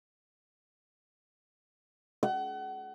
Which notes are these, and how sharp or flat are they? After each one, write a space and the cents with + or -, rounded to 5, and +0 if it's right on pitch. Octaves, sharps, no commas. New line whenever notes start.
F#5 +35